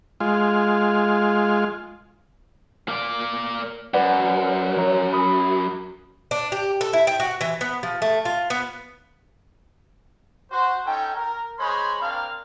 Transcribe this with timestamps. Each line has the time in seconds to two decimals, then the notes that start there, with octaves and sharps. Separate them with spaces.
0.20 G#3 F4
2.89 A#3 D5
3.94 F#2 B4 D5 F#5
4.77 F3 C#5 A#5
5.13 B5 D#6
6.31 D4
6.52 G4
6.81 A4
6.93 E4
7.07 G5
7.20 F#4
7.41 E3
7.61 B3
7.83 F3
8.02 A3
8.25 F4
8.50 B3
10.51 F#4 C5
10.86 C#4 D#4 A4 G5
11.15 A#4
11.59 G#3 C5 C#5 B5
12.01 A#3 C4 D4 A#4 F5